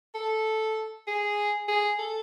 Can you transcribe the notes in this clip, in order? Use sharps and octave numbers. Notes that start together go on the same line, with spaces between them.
A4
G#4
G#4
A4